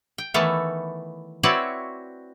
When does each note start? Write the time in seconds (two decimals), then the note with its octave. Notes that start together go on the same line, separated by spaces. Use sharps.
0.18 G5
0.34 D#3 E3 A3 B3 A4 C#5
1.43 C4 E4 F#4 B4 C#5 D5